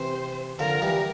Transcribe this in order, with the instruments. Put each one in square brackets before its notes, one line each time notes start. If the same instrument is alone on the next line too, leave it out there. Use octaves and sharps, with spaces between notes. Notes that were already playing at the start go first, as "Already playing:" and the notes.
Already playing: [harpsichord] C3 E3 [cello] C5
[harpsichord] D3 F3 [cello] A#4
[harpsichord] E3 G3